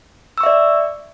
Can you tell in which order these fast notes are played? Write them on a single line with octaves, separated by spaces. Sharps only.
E6 C#6 E5 D5